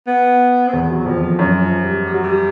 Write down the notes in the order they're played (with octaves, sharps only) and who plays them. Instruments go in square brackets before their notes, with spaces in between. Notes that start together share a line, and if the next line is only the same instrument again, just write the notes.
[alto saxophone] B3
C4
[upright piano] E2 [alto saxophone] B3
[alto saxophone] F3
F#3
[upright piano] F2 [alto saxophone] F3
[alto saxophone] F3
[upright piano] F#2
[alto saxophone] F3
G3
G3
F#3
G3